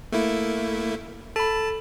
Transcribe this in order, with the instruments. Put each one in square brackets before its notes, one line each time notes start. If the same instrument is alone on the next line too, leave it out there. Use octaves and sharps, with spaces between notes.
[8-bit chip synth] A3 A#3 E4
[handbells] A4 B5 [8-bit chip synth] A5